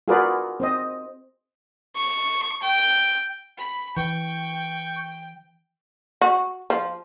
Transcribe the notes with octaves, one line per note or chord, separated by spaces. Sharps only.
F4 F#4 G#4 A#4 B4 D5
C4 C5 D#5
C#6
G5
B5
E3 G5 C#6 G6
F#4
F3